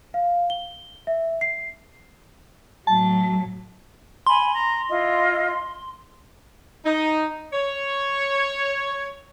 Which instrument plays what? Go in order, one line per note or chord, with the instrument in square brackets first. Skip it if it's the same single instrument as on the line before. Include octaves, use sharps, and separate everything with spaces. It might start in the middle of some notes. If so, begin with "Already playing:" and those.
[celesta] F5
G7
E5
C7
[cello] A2 F#3 [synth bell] A5
[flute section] G#5 B5 [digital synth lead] C6
[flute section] A#5
E4 F4 D#5
[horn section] D#4
C#5